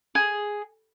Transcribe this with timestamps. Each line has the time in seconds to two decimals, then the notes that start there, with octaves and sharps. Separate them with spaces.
0.15 G#4